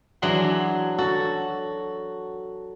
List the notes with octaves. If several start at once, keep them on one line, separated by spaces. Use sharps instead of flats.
E3 F#3 D4 G#4 E5 C6
F#4 A4